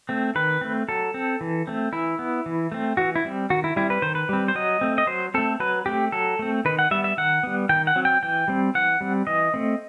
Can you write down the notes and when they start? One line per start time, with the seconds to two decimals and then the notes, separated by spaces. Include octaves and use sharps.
0.09 A3 C4
0.35 D#3 B4
0.61 A3 C4
0.89 F#3 A4
1.14 C4
1.41 E3
1.67 A3 C4
1.93 E3 E4
2.19 B3
2.46 E3
2.72 A3 C4
2.97 E3 F#4
3.16 E4
3.25 G3 C4
3.50 D#3 F#4
3.64 E4
3.76 G3 C4 E4
3.90 B4
4.02 D#3 C5
4.15 B4
4.29 G3 C4
4.48 C5
4.55 F#3 D#5
4.81 A3 C4
4.98 D#5
5.07 F#3 C5
5.34 A3 C4 A4
5.60 F#3 B4
5.86 A3 C4 G4
6.12 F#3 A4
6.39 A3 C4
6.65 D#3 B4
6.79 F#5
6.91 G3 B3 E5
7.04 E5
7.17 D#3 F#5
7.43 G3 B3
7.69 D#3 G5
7.87 F#5
7.96 F#3 C4
8.05 G5
8.23 E3 G5
8.48 G3 C4
8.75 E3 F#5
9.01 G3 C4
9.27 E3 D#5
9.54 A3 C4